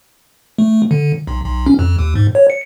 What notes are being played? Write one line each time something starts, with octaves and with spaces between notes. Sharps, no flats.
A3
D3
B1
B1
C#4
F2
D#2
G#2
C#5
C#7